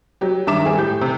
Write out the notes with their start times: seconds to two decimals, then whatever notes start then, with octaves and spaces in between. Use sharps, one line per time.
0.21 F#3 G4
0.47 G2 D#3 E5 A#5 D6 E7
0.65 G3 C4 G#4
0.77 A2 G4 G6
1.01 C3